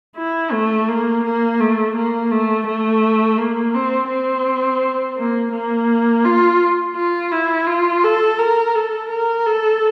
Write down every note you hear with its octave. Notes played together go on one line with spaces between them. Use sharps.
E4
A3
A#3
A#3
A3
A#3
A3
A3
A#3
C4
C4
A#3
A#3
F4
F4
E4
F4
A4
A#4
A4
A#4
A4